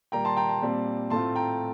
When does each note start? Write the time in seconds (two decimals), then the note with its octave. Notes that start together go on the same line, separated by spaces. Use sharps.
0.12 A#2 G3 A#3 G5 A#5
0.25 A5 C6
0.37 G5 A#5
0.49 A5 C6
0.62 A#2 G3 C4
1.10 A2 A3 C4 F4 A5 C6
1.35 G5 A#5